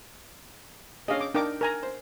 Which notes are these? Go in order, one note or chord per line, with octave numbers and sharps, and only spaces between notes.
C#4 D4 G#4 D#5 F5
D6
D4 D#4 A#4 G5 D6
A#4 G#5 A#5
C5